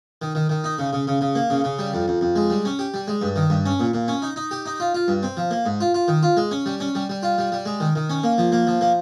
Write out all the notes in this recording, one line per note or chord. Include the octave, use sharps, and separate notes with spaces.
D#3
D#3
D#3
D#4
C#3
C#3
C#3
C#3
A#3
C#3
C#3
G3
F2
F2
F2
G#3
G3
C#4
G4
G3
G#3
G2
D#3
G2
C#4
A#2
A#2
C#4
D#4
D#4
G4
D#4
F4
F4
G2
C4
F3
A#3
G#2
F4
F4
D#3
F4
G#3
C#4
G3
C#4
G3
G3
F4
G3
G3
G#3
D#3
D#3
C#4
A#3
F3
A#3
F3
A#3